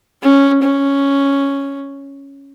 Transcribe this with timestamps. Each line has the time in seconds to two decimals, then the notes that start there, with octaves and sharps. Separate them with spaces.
0.22 C#4
0.63 C#4